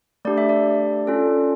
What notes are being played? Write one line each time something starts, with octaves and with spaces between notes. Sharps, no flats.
A3 D4 G4 D5
E5
D5
C#4 F4 A4